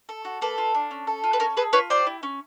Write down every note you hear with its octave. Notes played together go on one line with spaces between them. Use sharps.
A4
F#4
A#3 A4 B4
F4
D4
C#4
A4
F4
B4
C#4 A#4
G#4 A4 B4
F4 B4 C#5
G4 C5 D5
E4
C#4